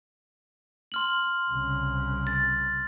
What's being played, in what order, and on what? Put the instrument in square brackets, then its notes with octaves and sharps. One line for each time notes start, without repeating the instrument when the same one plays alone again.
[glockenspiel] C6 F6 F#7
[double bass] C2 C#3
[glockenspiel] A6